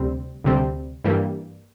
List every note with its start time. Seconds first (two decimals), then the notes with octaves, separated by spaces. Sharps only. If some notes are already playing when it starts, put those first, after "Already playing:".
Already playing: D2 C3 G3 C4
0.44 D2 C3 G3 C4
1.04 G2 E3 G3 A#3